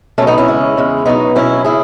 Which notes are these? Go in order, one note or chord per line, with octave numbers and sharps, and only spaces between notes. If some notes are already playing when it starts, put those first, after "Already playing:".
B2 F#3 A3 C#4
B3 D#4
C#4 E4
E2 C#3 G#3
E2 C#3 G#3
B2 F#3 B3 D#4
B2 F#3 C#4 E4
C#3 E4 G#4